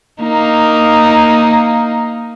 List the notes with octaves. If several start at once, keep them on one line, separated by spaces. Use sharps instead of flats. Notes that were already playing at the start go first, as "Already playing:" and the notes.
A#3 D#4